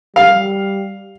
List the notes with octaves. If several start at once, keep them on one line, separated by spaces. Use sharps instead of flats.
G3 F5